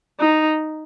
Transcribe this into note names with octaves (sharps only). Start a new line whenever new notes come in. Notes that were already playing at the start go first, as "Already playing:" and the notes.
D#4